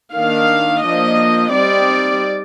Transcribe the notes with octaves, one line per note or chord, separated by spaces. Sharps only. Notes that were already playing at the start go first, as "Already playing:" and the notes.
D#3 A#3 D4 F5
F3 A#3 D4 D#5
G3 C4 D#4 D5